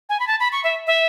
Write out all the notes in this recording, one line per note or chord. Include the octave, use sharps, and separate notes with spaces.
G#5
B5
A5
B5
C#6
E5
E5